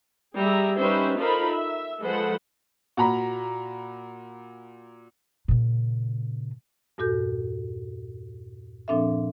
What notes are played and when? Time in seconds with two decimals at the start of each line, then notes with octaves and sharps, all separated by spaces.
0.35 G3 G#4 E5 A#5
0.77 G3 C#4 D#4 B4 C5 E5
1.18 D#4 F4 A4 A#4 C5 B5
1.51 E5
2.02 F3 G#3 A4 B4 C5 F#5
2.97 A#2 F#4 A#5 B5
5.48 A#2 C#3
6.98 E2 G2 A#2 F#4 A4 G6
8.88 A#2 F3 C4 D4 A4 E5